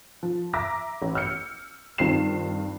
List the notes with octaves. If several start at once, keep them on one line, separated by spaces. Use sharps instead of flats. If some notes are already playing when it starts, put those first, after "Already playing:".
F3
E5 A#5 D6 E6 A#6 B6
A1
E6 F6 G6 C#7
G2 D#3 C4 F4 C7 E7